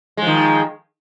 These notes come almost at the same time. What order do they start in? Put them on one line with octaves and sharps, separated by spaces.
G#3 F3 D#3